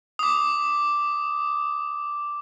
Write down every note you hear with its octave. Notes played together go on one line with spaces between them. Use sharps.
D6 D#6